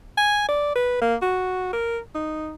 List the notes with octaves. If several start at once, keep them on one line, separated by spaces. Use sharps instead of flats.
G#5
D5
B4
A#3
F#4
A#4
D#4